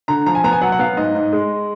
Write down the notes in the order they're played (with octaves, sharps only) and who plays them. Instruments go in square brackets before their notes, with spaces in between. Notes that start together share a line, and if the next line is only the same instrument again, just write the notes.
[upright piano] D3 A#5
F3 A#5
G#5
B3 A#5
G#5
F#3 F#5
F#5
B3 F5
G#2 D#5
G#2
G#3